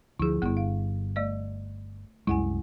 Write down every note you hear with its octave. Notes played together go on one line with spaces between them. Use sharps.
D2 F3 E4 G#4
G1 G2 B3 E4
F5
A3 D5 D#5
C2 F#2 G#3 E4 F#5 G#5